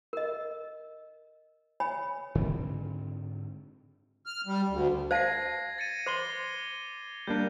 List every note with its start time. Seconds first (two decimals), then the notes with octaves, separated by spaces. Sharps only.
0.13 A#4 D#5
1.80 C#5 G#5 B5
2.35 G#2 D3 C4
4.26 F6
4.47 G3
4.69 D2
5.11 C5 F5 A5 G#6 A#6 C7
5.78 A6 C#7 D#7
6.06 C5 C6 D6 C7 G7
7.27 G3 A#3 D4 G6